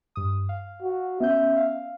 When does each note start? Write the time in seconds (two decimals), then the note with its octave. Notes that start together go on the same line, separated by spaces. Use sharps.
0.16 G2 D#6
0.49 F5
0.82 F#4
1.20 B3 C#4 E5 G6
1.56 F5